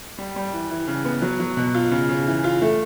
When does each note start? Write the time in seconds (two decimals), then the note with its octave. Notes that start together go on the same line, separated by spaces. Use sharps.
0.18 G3
0.36 G3
0.53 E3
0.70 E3
0.88 C#3
1.05 B3
1.22 F#3
1.40 F#3
1.57 B2
1.74 F4
1.91 C#3
2.09 C#3
2.27 E3
2.44 F4
2.62 A3